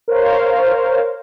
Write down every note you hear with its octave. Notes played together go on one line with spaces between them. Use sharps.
A#4 C5 C#5 F5